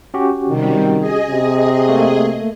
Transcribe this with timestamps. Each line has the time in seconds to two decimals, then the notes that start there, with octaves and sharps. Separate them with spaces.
0.14 C#4 F#4 G4
0.49 C3 D#3 G3
0.98 G#4 D#5
1.30 C3
1.89 A3 A#3